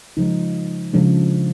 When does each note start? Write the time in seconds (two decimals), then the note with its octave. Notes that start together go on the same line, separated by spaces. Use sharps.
0.17 C#3 F3 G#3 D#4
0.94 C#3 F3 G#3 D4